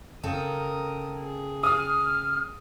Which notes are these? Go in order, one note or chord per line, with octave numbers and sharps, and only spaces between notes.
C#3 C4 A4 A#4 D#6
G#4
D#6 F6